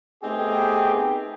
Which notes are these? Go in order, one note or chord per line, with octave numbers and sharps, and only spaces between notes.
A3 B3 C4 D#4 G4 G#4